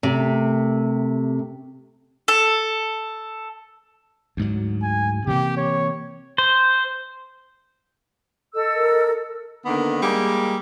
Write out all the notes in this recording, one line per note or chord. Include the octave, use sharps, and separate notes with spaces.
C3 A3 G4 A#4
A4
D2 G#2 F#3
G#5
C3 E3 A#3 G4
C#5
C5
A4 D#5 E6
A#4
D3 D#3 A#3 B3
G3 G#3 A#3